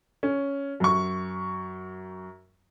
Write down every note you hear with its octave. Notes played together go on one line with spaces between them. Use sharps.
C#4
F#2 C#6